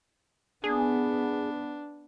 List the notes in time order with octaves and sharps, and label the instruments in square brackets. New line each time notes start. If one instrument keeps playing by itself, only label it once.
[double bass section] B3 [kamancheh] D4 [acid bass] G#4